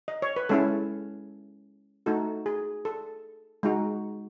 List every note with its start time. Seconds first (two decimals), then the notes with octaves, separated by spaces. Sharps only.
0.08 D#5
0.22 C#5
0.36 B4
0.49 G#3 C#4 E4 A4
2.06 A3 D#4 F#4 A4
2.46 G#4
2.85 A4
3.63 G#3 D#4 F#4